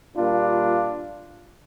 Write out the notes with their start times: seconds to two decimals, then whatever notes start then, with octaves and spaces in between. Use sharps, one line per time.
0.15 A#2 G3 A#3 D4 F4